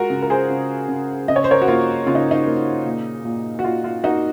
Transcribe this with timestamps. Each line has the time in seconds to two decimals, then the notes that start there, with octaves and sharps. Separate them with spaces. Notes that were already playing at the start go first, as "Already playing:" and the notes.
Already playing: G#3 F4 F#4 A#4
0.10 C#3
0.22 A#4
0.30 G#4 C5
0.50 C#3
0.88 C#3
1.28 C#3 D#5
1.36 C#5
1.44 C5
1.51 A#4 C#5
1.62 F#4
1.68 A#3 F4
2.06 C#3 F4
2.15 D#4
2.31 D#4
2.47 A#3
2.86 A#2
3.25 A#2
3.59 F#4
3.64 A#2 F4
3.84 F4
4.04 A#3 D#4 F#4